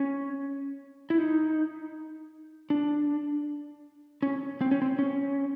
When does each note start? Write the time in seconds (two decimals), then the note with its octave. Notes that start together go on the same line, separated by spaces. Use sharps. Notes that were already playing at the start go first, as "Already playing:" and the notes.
Already playing: C#4
1.10 E4
1.18 D#4
2.70 D4
4.22 C#4
4.61 C4
4.71 C#4
4.82 C4
4.99 C#4